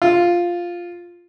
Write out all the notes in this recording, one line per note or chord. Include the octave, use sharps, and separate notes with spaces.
F4